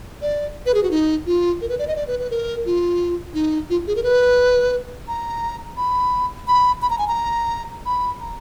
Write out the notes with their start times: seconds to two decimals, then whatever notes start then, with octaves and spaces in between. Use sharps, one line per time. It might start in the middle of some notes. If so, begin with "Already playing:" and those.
0.22 D5
0.66 B4
0.74 G#4
0.83 F#4
0.91 D#4
1.26 F4
1.61 A#4
1.69 B4
1.79 D5
1.87 D#5
1.96 D5
2.07 B4
2.19 B4
2.30 A#4
2.66 F4
3.34 D#4
3.70 F4
3.87 G#4
3.96 A#4
4.03 B4
5.08 A#5
5.77 B5
6.48 B5
6.82 B5
6.90 A#5
6.99 G#5
7.08 A#5
7.86 B5
8.21 A#5